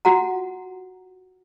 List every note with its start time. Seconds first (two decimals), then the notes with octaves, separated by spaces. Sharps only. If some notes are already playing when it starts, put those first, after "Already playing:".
0.05 F4 F#4 F#5 A#5